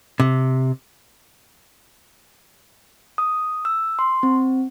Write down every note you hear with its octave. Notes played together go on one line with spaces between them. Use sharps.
C3
D#6
E6
C6
C4